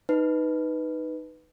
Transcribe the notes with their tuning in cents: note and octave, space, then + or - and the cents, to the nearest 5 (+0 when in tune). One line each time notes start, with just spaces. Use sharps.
D#4 +0 B4 +0